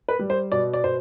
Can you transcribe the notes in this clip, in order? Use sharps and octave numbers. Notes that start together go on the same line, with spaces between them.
B4
G3
C5
B2 D5
D5
B2 C5